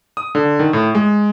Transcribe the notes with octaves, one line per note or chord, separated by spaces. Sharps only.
D#6
D3
D#3
A2
G#3